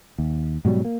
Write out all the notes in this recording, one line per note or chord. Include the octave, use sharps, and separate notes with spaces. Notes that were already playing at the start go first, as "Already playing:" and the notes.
D#2
G#2 B2 F#3 G3
A#3